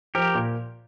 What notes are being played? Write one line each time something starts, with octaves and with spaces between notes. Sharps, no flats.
F3 G4 A#4
A#2